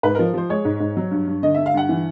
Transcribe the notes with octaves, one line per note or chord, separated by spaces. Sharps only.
G#2 B4
F3 A#4
F3 C5
G#3 C#5
G#2
G#2
F#3
G2
G2
D3 D#5
D3 E5
F5
G2 F#5
E3